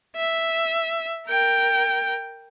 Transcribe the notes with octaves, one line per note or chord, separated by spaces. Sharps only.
E5
A#4 G5